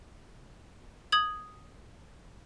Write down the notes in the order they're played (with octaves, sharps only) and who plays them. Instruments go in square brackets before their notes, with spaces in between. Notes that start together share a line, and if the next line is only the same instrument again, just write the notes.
[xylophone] D#6 G#6 F#7